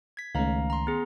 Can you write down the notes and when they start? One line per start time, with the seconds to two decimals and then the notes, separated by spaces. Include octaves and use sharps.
0.17 G#6 B6
0.35 C#2 D#3 A3 C#4 F5 A#5
0.70 A#5 C6
0.87 B3 G#4